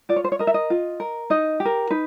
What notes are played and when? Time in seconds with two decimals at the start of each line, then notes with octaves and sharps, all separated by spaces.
0.09 F4 D5
0.16 C#5
0.24 C5
0.32 C#5
0.39 A#4 D#5
0.47 E5
0.54 D#5
0.70 F4
1.00 A#4
1.30 D#4 D#5
1.60 G4
1.65 A#4
1.90 D#4 B4